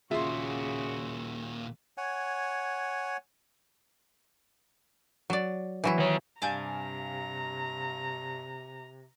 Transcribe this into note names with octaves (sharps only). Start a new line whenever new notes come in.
D#2 A#2 C#3 F4 F#4 G#4 E5 C6
C#5 F#5 G#5
F#3 D5
E3 F#3 E4
D#3 C#5
G2 C3 D5 F5 G#5 A#5 G6 E7